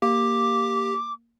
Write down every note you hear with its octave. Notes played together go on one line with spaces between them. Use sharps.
A#3 G4 D6